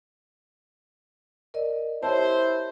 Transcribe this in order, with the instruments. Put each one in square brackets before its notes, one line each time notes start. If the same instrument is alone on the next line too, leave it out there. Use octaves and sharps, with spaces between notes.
[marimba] A#4 D5 D#5
[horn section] E4 C5 [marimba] G4 C#5 A5